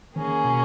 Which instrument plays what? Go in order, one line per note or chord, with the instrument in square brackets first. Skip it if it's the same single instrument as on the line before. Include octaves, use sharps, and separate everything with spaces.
[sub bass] D#3 [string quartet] A#3 C#4 G#4
[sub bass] B2